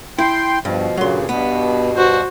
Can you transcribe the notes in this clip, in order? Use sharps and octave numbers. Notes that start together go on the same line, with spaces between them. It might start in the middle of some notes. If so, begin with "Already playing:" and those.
E4 G5 C6
G2 B2 F3
G2 A#2 C#3 F#3 C6
G2 B2 B3
F#4 C5